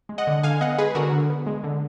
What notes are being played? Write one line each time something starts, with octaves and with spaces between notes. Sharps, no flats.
G#3
D#5 F#5
D3
D3 F5 G#5
B3 D#5 F#5
G#3 G#4 B4
D3 F#4 A#4
D3
B3
G#3
D3